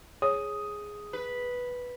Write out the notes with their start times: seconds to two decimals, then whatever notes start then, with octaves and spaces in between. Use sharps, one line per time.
0.22 G#4 C#5 D#6
1.13 B4